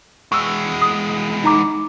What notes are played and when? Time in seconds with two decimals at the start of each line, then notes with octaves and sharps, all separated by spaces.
0.32 E2 G#3 C#6 E6
0.82 D#6
1.44 D#4 A#5 D6